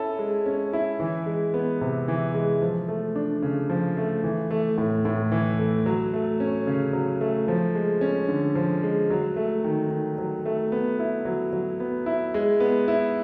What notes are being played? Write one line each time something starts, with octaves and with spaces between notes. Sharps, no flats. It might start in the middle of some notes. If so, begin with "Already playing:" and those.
Already playing: C#4 E4 A4
G#3
C#4
E4
E3
G#3
B3
C3
E3
G#3
F3
A3
D4
C#3
F3
A3
E3
A3
A2
A2
E3
A3
F#3
A3
C#4
C#3
F#3
A3
F3
G#3
C#4
D3
F3
G#3
F#3
A3
D#3
D#3
F#3
A3
B3
E4
F#3
F#3
B3
E4
G#3
B3
E4